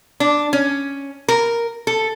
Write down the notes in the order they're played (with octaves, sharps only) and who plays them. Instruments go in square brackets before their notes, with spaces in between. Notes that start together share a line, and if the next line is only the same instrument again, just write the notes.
[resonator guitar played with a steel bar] D4
C#4
A#4
A4